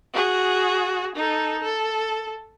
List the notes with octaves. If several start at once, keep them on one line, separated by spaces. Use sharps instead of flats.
F#4 G#4
D#4 A4
A4